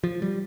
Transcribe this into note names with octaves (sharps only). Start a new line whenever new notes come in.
F3
G3